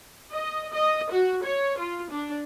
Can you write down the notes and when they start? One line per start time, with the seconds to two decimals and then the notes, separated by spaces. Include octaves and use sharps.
0.33 D#5
0.72 D#5
1.11 F#4
1.43 C#5
1.78 F4
2.10 D4